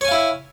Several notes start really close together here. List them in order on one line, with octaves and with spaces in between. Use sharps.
C#5 G#5 F5 E4